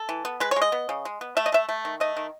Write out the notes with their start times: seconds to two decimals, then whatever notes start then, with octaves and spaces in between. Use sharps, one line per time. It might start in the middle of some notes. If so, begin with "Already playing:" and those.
Already playing: A4
0.09 E3
0.25 B3
0.40 G#3 B4
0.51 C#5
0.56 G#3
0.62 D#5
0.72 B3
0.89 C#3
1.05 G#3
1.21 B3
1.37 A3 E5
1.46 D#5
1.52 A3 E5
1.69 A3
1.85 D#3
2.00 A3 D#5
2.17 D#3